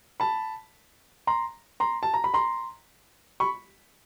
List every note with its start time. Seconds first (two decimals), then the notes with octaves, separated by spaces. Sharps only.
0.20 A5 B5
1.27 A#5 C6
1.80 A#5 C6
2.03 A5
2.14 A#5
2.24 B5
2.34 A#5 C6
3.40 B5 C#6